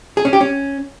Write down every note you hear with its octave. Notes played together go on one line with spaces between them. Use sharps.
G#4
C#4
G4
C#4